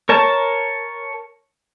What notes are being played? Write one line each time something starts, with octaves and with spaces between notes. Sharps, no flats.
A#4 C#5 A5